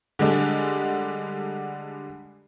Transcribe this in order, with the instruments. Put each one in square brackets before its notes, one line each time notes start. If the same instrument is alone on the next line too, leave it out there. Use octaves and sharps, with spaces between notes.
[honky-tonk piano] D3 G3 G#3 D4